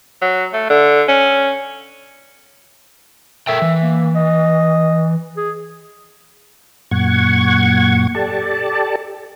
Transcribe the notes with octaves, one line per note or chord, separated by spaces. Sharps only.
F#3
A3
D3
C#4
A4 A#4 E5 G5
E3
A#3
D#5
G#4
F#2 A#2 F#5 C#6 G#6
G4 A4 D5 A5